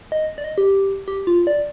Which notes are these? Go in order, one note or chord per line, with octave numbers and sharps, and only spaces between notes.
D#5
D5
D#5
G4
G4
F4
D5